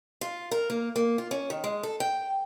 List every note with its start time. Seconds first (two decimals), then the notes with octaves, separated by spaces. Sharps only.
0.21 F4
0.51 A#4
0.70 A#3
0.96 A#3
1.18 F4
1.31 C#4
1.50 D#3
1.64 G#3
1.83 A4
2.00 G5